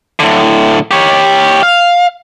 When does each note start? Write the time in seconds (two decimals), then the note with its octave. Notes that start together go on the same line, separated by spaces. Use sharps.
0.20 A2 D3
0.91 G4 C#5
1.63 F5